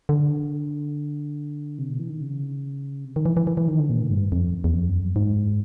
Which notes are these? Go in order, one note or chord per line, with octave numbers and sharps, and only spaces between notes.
D3
C3
B2
E3
D#3
C#3
C3
D#3
E3
E3
E3
E3
D#3
D3
A#2
A2
G2
F2
E2
F2
F#2
G#2